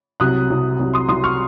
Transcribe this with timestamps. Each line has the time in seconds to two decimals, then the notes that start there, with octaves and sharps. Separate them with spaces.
0.20 C2 C3 F#3 D#6 F#6
0.50 C2 C3 F#3
0.79 C2 C3 F#3
0.94 C6 D#6
1.08 C2 C3 F#3 C6 D#6
1.24 C#6 F6